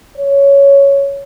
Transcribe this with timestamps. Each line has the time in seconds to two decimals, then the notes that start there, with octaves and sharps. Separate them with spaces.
0.17 C#5